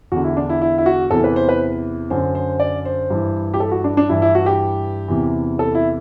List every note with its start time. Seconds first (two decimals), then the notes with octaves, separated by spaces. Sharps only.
0.12 E2 D3 F#4
0.24 E4
0.37 D4
0.49 E4
0.62 E4
0.78 E4
0.86 F#4
1.11 E2 C3 E3 A4
1.24 B4
1.36 C5
1.49 B4
2.10 F#2 D3 C5
2.35 C5
2.60 D5
2.85 C5
3.10 G2 E3
3.54 G4
3.60 A4
3.71 F#4
3.84 D4
3.97 D4
4.09 G2 E3 E4
4.22 E4
4.35 F#4
4.46 G4
5.08 E2 C3 E3
5.59 A4
5.75 E4